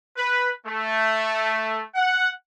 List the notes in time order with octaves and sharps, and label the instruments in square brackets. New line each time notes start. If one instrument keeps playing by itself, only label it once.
[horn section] B4
A3
F#5